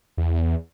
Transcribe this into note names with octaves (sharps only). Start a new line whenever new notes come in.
E2